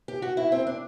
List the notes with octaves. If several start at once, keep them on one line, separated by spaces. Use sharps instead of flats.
G4
F#4
E4
C4
D4